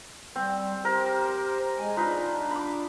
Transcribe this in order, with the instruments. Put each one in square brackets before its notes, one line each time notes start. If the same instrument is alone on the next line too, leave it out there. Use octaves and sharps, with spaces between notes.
[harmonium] G3 [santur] C4
[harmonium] G4 C5 [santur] A#4
[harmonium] G#3 G#5
[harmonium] D4 [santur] D#4 F4 B4
[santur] B5 D6